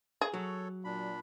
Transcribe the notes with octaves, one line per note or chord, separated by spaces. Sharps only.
G#4
F#3 A4 C#5
A#2 D4 B5